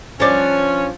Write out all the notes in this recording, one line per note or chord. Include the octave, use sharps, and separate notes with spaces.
F3 C#4 D4